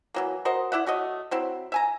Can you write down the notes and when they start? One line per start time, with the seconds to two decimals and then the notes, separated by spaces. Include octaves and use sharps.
0.14 E3 F#3 A#3
0.45 F#4 A#4 C5 D#5
0.72 E4 D5 E5 F#5
0.86 A3 F#4 C#5 D#5
1.31 F#3 C4 E4
1.72 E5 G#5 A#5